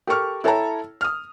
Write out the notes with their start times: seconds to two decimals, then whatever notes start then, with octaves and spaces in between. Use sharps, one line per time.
0.07 G4 A4 A#4 C#6 F6
0.44 E4 A4 C#5 G5 A5 A#5
1.01 D#6 F6